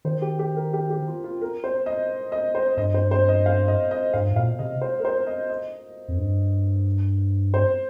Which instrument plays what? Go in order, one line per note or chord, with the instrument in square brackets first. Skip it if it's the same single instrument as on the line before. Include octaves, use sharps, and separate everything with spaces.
[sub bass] D#3 [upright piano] C5
[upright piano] G4
G4
A#4
G4
G4
F4
F4
A#4
C5
D#5
D#5
C5
[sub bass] G2 [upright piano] D#5
[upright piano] C5
C5
D#5
F5
D#5
D#5
[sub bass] G2 [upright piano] F5
[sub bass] G2
[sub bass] A#2 [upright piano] F5
[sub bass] C3 [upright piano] D#5
[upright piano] C5
A#4
C5
D#5
D#5
[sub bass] F2
G2
[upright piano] C5